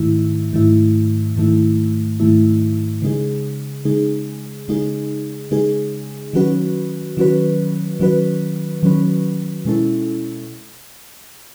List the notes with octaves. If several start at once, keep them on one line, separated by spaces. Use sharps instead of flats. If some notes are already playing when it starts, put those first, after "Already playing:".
Already playing: G#2 D#3 A3 E4
G#2 D#3 A3 E4
G#2 D#3 A3 E4
G#2 D#3 A3 E4
C#3 G#3 D#4 G#4
C#3 G#3 D#4 G#4
C#3 G#3 D#4 G#4
C#3 G#3 D#4 G#4
D#3 F#3 C#4 F#4 B4
D#3 F#3 C#4 F#4 B4
D#3 F#3 C#4 F#4 B4
D#3 F#3 C#4 F#4 B4
B2 G#3 C#4 E4 A4